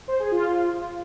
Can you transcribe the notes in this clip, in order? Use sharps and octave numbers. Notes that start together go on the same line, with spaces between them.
C5
G#4
F4